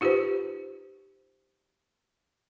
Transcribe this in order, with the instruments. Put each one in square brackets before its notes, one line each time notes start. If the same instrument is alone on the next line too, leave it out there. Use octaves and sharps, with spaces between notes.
[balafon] D#4 F4 G4 B4 C5